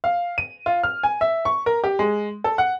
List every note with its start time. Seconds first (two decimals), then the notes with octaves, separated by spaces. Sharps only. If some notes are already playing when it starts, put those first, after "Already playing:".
0.04 F5
0.38 D#7
0.66 F4
0.84 F6
1.03 G#5
1.21 E5
1.45 C#6
1.66 A#4
1.84 G4
1.99 G#3
2.44 A4
2.58 F#5